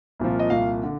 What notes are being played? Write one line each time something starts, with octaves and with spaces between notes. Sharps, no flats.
C2 A#2 F3
D#5
C2 A#2 F3 F5
D3